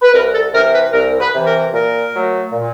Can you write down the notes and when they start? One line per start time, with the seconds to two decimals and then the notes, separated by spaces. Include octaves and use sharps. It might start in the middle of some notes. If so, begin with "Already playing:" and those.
0.02 B4
0.13 C2 A#4
0.34 A4
0.54 C3 E3 A#4
0.73 B4
0.93 C2 A#4
1.20 B4
1.34 C3 E3
1.46 A#4
1.73 A#2 A#4
2.13 F#3 A3
2.53 A#2